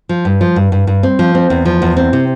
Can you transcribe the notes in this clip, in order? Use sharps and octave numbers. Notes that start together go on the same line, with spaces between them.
F3
G2
F3
G2
G2
G2
C4
F3
C4
E2
F3
E2
C4
C3